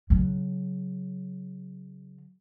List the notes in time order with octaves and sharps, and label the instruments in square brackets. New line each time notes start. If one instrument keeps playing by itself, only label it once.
[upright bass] C#3 F#3